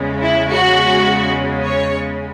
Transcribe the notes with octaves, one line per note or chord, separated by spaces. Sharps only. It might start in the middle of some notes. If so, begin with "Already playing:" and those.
Already playing: E2 C#3 G#3
E4
F#4
C#5